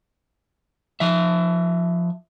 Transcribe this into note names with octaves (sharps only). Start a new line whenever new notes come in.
F3 E5